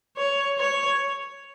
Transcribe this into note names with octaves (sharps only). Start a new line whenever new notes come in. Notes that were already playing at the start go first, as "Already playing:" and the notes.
C#5
C#5